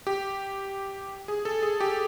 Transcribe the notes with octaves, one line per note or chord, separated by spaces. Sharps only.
G4
G#4
A4
G#4
G4